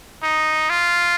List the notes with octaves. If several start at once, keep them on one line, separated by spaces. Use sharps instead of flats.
D#4
F4